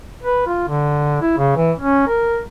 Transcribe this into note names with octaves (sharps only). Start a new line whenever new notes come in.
B4
F4
D3
E4
C#3
E3
C#4
A#4